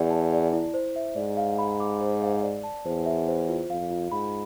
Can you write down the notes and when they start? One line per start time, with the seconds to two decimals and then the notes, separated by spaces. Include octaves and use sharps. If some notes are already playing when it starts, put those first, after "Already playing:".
Already playing: E2 D5
0.10 A5
0.33 D5
0.53 E4
0.74 C5
0.96 E5
1.16 G#2 D5
1.37 F5
1.58 B5
1.80 D6
2.00 C5
2.22 F5
2.43 D5
2.64 A5
2.86 E2 C5
3.06 E5
3.28 C5
3.49 F4
3.70 F2 F5
3.91 F4
4.12 G#2 B5